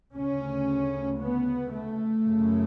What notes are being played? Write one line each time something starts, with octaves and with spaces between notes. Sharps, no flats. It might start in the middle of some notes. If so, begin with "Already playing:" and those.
D2 C#3 C#4
B3
A3
F#2 C#3